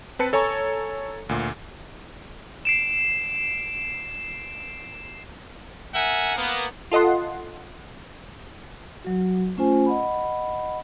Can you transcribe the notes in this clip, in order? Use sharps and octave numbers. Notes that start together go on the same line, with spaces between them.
C4 B4 A5 C#7
A4 C#5 G#5 A#5 C#6
D2 A#2
C7 D7 E7
A#4 E5 F#5 G#5
A#3 B3
F4 A4 D#5 F#5 C6
F#3 F#4
A3 C#4 F4 C5 G#5
D#5 F#5 B5